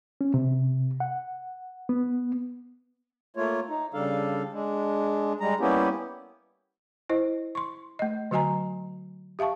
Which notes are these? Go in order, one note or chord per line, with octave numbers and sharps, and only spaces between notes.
C#4
C3
F#5
B3
A3 A#3 F4 C#5
D#4
C#3 G3 D4 A4 F5
G#3 D4
G3 G#3 A#5
G3 A#3 B3 C#4 E4 G4
E4 C5 D#5
C6 C#6
A3 D#5
D3 F#3 F#4 D#5 G#5 A#5
G4 E5 F5 A5 C#6